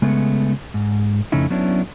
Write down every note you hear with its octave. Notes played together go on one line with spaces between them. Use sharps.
C#3 G#3 A3 B3
G#2
F2 C#3 A3 C#4 D#4 E4
F#3 B3 C#4 D4 E4